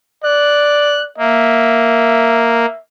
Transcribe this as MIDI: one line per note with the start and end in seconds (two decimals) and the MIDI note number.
0.24 1.08 74
0.24 1.02 90
1.18 2.66 58
1.18 2.80 76